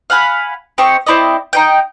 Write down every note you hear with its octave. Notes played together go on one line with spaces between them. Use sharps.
F5 F#5 G#5 B5
C4 G4 D#5 C#6
C4 E4 D5 D#5
D#4 D#5 G5